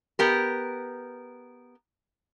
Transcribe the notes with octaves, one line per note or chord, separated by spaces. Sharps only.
B3 G4 A#4